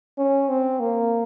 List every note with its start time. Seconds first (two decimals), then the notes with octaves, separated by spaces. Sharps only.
0.18 C#4
0.49 C4
0.80 A#3